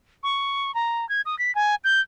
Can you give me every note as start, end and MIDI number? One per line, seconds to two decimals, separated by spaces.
0.23 0.74 85
0.75 1.08 82
1.09 1.21 92
1.26 1.38 87
1.39 1.54 95
1.55 1.75 80
1.84 2.01 91